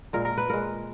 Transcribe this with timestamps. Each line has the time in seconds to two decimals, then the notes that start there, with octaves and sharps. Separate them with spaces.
0.13 A#2 G#3 A#4
0.25 A#4
0.37 B4
0.49 A#2 G#3 A#4